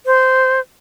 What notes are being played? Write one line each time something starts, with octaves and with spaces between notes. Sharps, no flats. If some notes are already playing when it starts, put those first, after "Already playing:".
C5